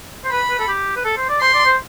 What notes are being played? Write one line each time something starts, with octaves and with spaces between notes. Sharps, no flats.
C5
B4 B5
B4
A4
G4
B4
A4
C5
D5
C5 C6
D5
C5